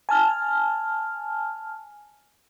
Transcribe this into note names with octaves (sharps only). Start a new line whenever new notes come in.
G#5 A5 F6